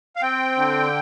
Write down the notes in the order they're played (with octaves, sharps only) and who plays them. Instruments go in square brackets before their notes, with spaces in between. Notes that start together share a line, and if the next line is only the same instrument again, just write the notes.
[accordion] F5
C4 G5
D3